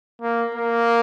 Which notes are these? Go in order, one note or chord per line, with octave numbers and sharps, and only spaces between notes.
A#3
A#3